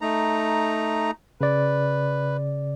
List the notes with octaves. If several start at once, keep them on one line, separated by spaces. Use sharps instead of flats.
A3 D#4 A#5
C#3 B4 D5